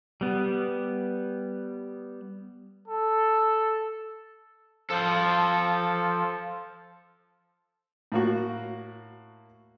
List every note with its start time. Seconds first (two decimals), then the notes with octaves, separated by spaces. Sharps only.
0.21 G3 B3
2.88 A4
4.90 F3 A4 C5
8.12 A2 A#3 F#4